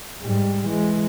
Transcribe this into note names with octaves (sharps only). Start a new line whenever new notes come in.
G#2 G3
E3 G#3